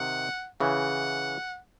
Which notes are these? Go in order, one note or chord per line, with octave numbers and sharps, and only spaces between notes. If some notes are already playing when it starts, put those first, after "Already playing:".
Already playing: C3 D#3 F#5
C#3 E3 F#5